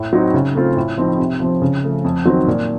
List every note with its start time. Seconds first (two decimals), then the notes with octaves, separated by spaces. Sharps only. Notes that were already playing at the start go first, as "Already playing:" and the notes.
Already playing: A2
0.13 F#3 C4 D#4
0.34 C#3
0.55 A3 C4 F4
0.77 A2
0.98 F3 C4 D#4
1.18 C3
1.40 F3 C4
1.62 C#3
1.83 F3 A3
2.04 F2
2.25 D#3 F#3 C4 D#4
2.47 A#2